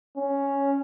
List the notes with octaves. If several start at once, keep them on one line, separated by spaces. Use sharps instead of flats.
C#4